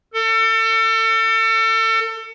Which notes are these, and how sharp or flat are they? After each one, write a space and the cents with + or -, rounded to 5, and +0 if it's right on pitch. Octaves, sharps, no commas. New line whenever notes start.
A4 +35